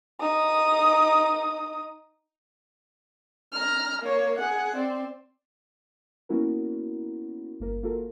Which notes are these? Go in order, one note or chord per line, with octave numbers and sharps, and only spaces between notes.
D#4 D#6
A#5 F6
A#3 C#5
G#4 F#5
C4 D5
A#3 B3 C#4 E4 F#4 A#4
G1 A#3 A#4
A#3 F4 F#4 A4 A#4